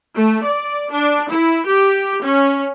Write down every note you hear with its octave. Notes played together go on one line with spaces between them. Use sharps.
A3
D5
D4
E4
G4
C#4